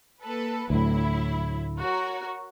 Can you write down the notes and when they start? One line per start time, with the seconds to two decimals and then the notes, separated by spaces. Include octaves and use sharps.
0.21 A#3 A4 B4
0.70 D2 A2 F#3 E4
1.80 F#4 A#4 C#5